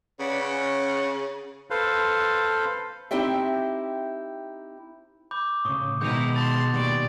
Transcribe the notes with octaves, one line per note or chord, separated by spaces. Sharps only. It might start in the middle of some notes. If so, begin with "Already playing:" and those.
C#3 B4 D5 F#5
C#4 F#5
A4 B4 C5 F5
C4 D#4 E4 G4 E5
B5 D6 G6
A2 C#3 C#6 D#6
B2 D#3 G#3 D#4 E4 G6 F7
A5 B5 C6 A6
A#2 D#3 G3 D5 B5 C#6